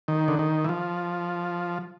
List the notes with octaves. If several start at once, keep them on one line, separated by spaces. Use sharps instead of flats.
D#3
D3
D#3
E3
F3